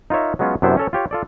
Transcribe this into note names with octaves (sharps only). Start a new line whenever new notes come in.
D#4 F4 A#4 C#5 E5
F#3 G#3 B3 C#4 F4
F#2 C3 B3 D4 E4 C5
C#4 A4 C#5
F4 G4 C#5
F4 A4 D5